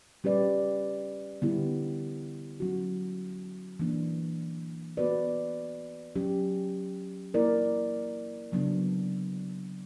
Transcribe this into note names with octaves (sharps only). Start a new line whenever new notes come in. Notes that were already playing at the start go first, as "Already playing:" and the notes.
G3 C#4 G4 B4 D5
D3 G3 B3 E4 G4
F#3 C#4 F#4
E3 A#3 D4
B3 F#4 B4 D5
F#3 C#4 G4
A#3 E4 A#4 D5
C#3 F#3 B3 D4